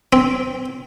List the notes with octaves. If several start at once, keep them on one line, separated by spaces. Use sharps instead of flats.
C4